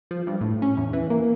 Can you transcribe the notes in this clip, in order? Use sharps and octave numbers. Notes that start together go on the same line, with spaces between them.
F3
G2
A2
C#4
E2
E3
A#3